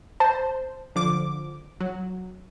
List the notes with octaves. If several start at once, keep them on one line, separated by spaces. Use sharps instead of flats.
C5 A5
D3 F3 D6
F#3